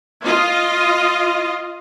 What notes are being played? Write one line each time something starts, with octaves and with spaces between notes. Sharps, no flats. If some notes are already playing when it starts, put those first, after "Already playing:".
F4 D#5